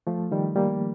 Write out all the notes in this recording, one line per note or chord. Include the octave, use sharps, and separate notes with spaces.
F3 A3
D#3 G3
G3 A#3